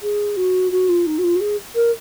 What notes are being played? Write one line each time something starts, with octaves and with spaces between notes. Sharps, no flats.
G#4
F#4
F#4
F4
D#4
F#4
F4
F#4
G#4
A#4